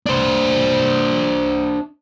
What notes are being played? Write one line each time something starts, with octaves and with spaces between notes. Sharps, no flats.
D4 C5